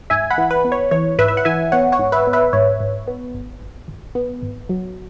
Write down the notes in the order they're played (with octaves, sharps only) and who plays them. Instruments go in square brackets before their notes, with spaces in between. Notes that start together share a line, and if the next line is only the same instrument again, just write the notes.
[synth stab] G#2 E5 G#5
F#5 B5
E3
B4
B3
C#5
E3 C#5
G#2 B4 E5
E5
F#5
E3 E5 G#5
B3 C#5 F#5
C#5 F#5
G#2
B4 E5
B3
B4 E5
G#2 C#5
G#2
B3
G#1
G#1
G#1
B3
G#1
F#3